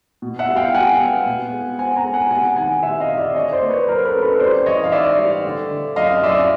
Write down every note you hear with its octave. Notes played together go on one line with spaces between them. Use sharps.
B2
E5 F#5
G3
F5 G5
G3 F#5 G#5
B3
B2
G#3
C4 F#5 G#5
G#5 A#5
G#3
F#5 G#5
C3 F#5 G#5
D#3 F#5 G#5
C3 E5 F#5
D#5 F5
C3
D5 E5
D3 C#5 D#5
C5 D5
A#3
B4 C#5
F#3 A#4 C5
A4 B4
C#4
A4 B4
G3 C5 D5
E3 C#5 D#5
F5
G#2 D5 E5
G3
D3
D3
F#2 D#5 F5
F#2 D5 E5